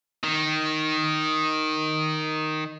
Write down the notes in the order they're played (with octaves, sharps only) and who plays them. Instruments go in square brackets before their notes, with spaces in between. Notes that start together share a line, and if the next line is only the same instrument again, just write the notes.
[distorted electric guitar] D#3